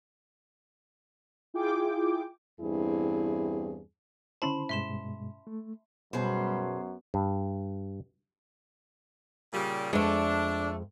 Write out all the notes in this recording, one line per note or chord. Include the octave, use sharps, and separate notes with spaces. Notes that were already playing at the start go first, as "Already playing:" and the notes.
E4 F4 G#4 G5 D6
E2 G2 C4 E4 G#4
D3 C#4 E4 C5 A5 B5 C6
G2 B2 G#3 E5 C6 E7
A3
F#2 B2 G3 G#4 C5
G2
A#2 C#3 G3
F2 G#3 A3 B3 D4